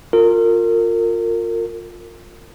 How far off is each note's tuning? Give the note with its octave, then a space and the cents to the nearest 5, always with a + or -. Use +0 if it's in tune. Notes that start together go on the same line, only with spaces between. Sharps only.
F4 +20 A#4 -30